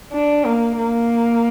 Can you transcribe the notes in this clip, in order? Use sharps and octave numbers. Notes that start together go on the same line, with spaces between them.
D4
A#3
A#3